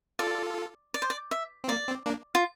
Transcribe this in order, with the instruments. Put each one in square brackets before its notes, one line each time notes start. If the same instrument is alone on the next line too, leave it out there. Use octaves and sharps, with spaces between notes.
[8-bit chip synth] F4 A4 [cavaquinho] D5
[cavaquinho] D5
C5
D5
E5
[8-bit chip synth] C4
[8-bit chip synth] A#3 [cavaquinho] D5
[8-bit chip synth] C4
A#3 D4
[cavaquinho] F4